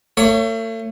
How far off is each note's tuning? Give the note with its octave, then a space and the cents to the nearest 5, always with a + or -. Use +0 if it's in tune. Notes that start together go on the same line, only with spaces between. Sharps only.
A3 +40 C#5 +0